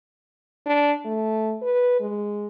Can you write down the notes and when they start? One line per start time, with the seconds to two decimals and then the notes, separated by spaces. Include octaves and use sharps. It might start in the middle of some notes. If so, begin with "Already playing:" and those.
0.66 D4
1.05 A3
1.62 B4
2.00 G#3